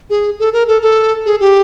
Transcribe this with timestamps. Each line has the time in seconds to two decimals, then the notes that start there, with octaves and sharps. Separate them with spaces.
0.10 G#4
0.39 A4
0.53 A#4
0.68 A4
0.82 A4
1.26 G#4
1.40 G4